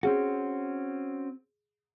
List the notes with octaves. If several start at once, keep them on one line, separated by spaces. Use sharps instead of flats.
C4 C#4 F#4 G#4